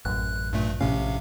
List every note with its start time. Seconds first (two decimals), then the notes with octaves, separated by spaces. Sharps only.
0.05 A1 F#2 F#6
0.53 G2 A#2 A3
0.81 A#1 A2 C3 C#4 F5